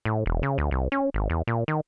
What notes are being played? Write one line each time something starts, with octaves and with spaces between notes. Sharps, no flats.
A2
E1
C#3
D2
C2
C#4
G#1
E2
A#2
D#3